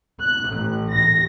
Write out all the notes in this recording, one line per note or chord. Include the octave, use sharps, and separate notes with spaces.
F#6
A1
A#6